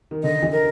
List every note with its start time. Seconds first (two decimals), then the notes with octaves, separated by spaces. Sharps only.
0.11 D#3
0.23 D3 D#5
0.42 E3
0.52 A#4